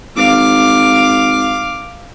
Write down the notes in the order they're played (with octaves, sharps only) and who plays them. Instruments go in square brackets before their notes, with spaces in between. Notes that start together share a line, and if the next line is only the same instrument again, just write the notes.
[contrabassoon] G#1 [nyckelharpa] F5 D6